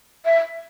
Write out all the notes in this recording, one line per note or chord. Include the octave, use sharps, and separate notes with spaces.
E5